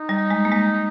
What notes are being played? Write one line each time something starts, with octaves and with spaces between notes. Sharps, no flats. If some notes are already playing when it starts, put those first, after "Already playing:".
Already playing: D#4
G3
G#3
A#3
G#3